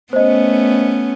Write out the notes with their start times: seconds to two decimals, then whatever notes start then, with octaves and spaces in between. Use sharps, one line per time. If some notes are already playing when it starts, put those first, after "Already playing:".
0.13 A3 B3 C#4 C5 D#5